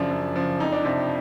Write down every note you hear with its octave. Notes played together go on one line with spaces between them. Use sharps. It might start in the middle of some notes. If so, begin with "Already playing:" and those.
Already playing: F#2 C#3 F3 D4
F#2
C#3 F3
F2 D#4
D4
C3 F3 D#4